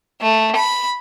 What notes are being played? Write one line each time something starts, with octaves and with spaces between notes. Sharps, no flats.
A3
B5